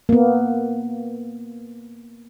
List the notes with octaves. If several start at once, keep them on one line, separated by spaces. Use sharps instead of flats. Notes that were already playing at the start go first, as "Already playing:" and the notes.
A#3 B3